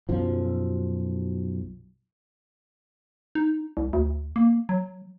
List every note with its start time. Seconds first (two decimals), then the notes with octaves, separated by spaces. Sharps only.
0.09 B1 F#2 F3
3.35 D#4
3.77 C2
3.93 D2
4.36 A#3
4.69 F#3